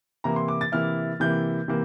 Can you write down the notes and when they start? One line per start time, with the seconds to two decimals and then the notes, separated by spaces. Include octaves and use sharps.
0.24 C3 E3 A#3 E4 A#5
0.36 C6
0.48 D6
0.61 A6
0.72 C3 E3 A#3 E4 F6
1.20 C3 E3 A#3 E4 G6
1.68 C3 E3 A#3